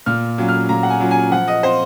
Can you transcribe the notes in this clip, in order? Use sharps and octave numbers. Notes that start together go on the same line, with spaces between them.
A#2 F6
F#3 C#4 F4
F6
A#2 A#5
F#5
G#5
F#3 C#4 F4
G#5
F3 F#5
D#5
C4 F4 C5